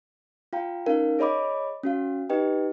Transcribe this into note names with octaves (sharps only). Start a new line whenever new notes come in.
F4 F5 G5 A#5
C#4 D#4 A#4 F5
G#4 C#5 D#5 B5 D6
C#4 F#4 F5
D#4 G4 B4 D#5 G5